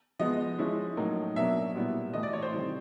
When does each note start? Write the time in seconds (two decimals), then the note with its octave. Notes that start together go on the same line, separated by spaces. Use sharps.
0.20 F3 G#3 B3 D#5
0.59 F3 G#3 C#4 E4
0.97 A2 F#3 A#3 D#4
1.36 B2 F#3 A#3 D4 E5
1.75 A#2 G3 B3 E4
2.13 A2 E3 A3 D#5
2.23 D5
2.33 C#5
2.42 C5
2.52 C3 D#3 G3 C4 E4